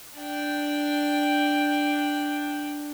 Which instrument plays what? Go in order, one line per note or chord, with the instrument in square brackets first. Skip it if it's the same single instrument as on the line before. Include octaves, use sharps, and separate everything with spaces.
[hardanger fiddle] D4 G5